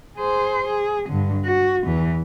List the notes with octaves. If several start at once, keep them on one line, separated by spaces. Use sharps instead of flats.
G#4 C5
G#4
G2 D3
F#4
E2 E3